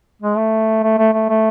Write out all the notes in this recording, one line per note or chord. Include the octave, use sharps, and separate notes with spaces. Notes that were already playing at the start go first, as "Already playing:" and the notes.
G#3
A3
A3
A3
A3
A3